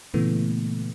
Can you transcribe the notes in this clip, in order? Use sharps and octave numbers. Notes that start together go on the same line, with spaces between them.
A#2 C#3 E3 A3 B3